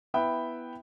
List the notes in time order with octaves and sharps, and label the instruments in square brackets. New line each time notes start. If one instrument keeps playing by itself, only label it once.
[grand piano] B3 E4 E5 G5 B5